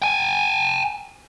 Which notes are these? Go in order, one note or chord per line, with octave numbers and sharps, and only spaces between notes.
G5 G#5